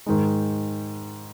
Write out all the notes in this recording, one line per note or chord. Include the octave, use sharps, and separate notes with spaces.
G#2 D#3 G#3 D#4